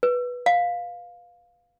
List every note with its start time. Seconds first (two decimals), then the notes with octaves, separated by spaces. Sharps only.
0.03 B4
0.46 F5